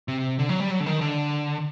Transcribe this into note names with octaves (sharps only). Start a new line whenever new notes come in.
C3
D3
F#3
G3
F#3
D3
D#3
D3